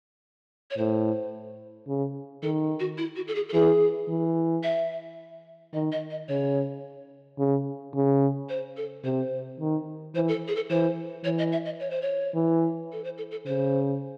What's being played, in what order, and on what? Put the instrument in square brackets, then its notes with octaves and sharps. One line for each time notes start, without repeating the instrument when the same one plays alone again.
[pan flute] C#5
[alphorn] A2 [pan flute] C5
[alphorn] C#3
[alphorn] D#3 [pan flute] A4
[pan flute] F#4
E4
F#4
A4
G#4
A4
[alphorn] E3 [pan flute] G#4
[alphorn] E3
[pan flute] E5
[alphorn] D#3 [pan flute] D#5
[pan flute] D#5
D#5
[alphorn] C#3 [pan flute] C#5
[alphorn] C#3
C#3
[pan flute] C5
A4
[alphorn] C3 [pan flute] C5
[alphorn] D#3
[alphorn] E3 [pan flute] C5
[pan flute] A4
G#4
A4
[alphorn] E3 [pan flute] C5
[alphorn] E3 [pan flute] C#5
[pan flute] D#5
E5
D#5
C#5
C5
C#5
[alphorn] E3
[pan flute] A4
C5
A4
A4
[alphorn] C#3 [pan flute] C5